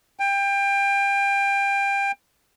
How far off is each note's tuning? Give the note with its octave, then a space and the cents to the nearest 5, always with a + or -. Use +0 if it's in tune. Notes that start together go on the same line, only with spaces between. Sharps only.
G5 +25